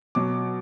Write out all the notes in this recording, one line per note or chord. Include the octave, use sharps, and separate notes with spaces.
B2 F#3 D6